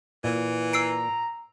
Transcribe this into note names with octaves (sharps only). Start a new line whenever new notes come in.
A#2 E3
A#5 E6 C7 D7